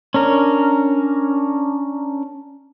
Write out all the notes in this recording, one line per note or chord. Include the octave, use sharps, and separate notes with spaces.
C#4 D4 A#4